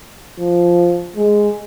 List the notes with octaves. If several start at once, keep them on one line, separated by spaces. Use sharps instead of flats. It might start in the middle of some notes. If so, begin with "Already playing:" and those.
F3
G#3